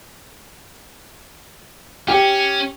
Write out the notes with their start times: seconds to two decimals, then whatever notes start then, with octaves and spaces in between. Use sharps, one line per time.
2.08 C#4 G4